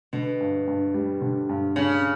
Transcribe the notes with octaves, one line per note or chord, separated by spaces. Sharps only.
B2 D3
G2
G2
G3
D3
G2
G2 C#3